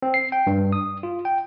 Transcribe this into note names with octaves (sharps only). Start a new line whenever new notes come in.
C4
C7
G5
G2
D#6
F4
G5